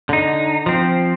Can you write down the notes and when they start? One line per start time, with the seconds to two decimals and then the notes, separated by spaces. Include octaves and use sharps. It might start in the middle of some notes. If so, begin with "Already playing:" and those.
0.09 D3 D#4
0.66 F3 C4